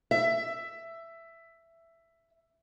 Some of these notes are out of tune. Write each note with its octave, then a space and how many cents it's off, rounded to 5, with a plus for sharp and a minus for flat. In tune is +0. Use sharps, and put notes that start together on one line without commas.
E5 +10